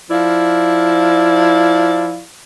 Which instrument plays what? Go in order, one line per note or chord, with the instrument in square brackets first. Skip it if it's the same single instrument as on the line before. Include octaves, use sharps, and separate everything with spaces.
[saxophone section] F3 E4 D5 F5